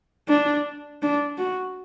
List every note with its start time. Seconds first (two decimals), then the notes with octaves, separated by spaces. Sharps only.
0.29 D4
1.02 D4
1.38 F#4